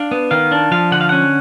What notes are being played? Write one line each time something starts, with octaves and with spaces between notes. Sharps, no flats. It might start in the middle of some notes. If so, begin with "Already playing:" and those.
Already playing: D4 F5
B3
D#3 F5
D4
F3 F5
D3 F#5
F5
C#4 F#5